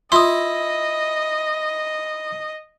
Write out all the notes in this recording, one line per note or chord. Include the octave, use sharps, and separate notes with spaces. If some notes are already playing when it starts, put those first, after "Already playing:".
E4 F4 D#5 C6 D#6